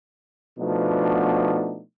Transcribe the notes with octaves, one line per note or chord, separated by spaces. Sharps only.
B2 F3 A3 B3 D4 D#4